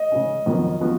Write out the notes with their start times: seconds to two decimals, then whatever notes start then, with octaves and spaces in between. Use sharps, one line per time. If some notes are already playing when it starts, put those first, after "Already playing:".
Already playing: D#5
0.12 C#3 G#3 C#4
0.46 F2 D#3 F#3 B3
0.81 F3 B3 F#4